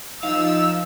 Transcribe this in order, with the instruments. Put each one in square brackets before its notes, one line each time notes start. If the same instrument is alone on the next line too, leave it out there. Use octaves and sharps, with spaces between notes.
[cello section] F3 [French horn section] D#4 [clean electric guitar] F5 [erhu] E6